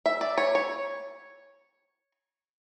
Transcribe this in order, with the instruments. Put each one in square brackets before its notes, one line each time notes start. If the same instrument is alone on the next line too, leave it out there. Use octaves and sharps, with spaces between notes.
[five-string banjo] E5
D5
C#5
C#5